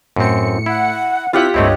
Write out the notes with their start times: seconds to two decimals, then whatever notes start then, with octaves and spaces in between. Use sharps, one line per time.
0.16 F#2 A2 C4 C#7
0.66 E4 F#5
1.33 C3 E4 F4 G4 F#5 B6
1.54 C#2 G2 A3 C4 E4 C#5 D#5